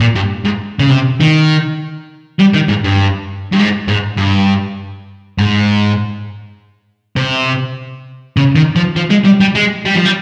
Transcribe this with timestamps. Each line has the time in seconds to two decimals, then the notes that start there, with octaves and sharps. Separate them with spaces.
0.01 A#2
0.16 G2
0.45 G#2
0.79 C#3
0.90 C3
1.20 D#3
2.40 G3
2.54 D#3
2.69 G#2
2.84 G2
3.52 G2
3.59 G#2
3.88 G#2
4.18 G2
5.39 G#2
7.16 C3
8.37 C#3
8.55 D#3
8.76 F3
8.96 F3
9.10 G#3
9.25 G3
9.41 G3
9.55 G#3
9.85 G3
9.95 F3
10.05 G3